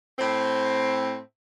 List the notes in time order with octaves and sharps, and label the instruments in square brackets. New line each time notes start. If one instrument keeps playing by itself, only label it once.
[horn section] A2 C4